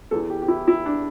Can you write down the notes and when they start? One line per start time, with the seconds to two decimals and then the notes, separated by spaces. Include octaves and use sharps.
0.11 E2 E3 A4
0.30 G4
0.42 G4
0.48 E4
0.68 E4
0.86 D4